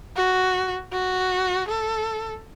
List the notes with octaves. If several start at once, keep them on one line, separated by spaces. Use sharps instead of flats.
F#4
F#4
A4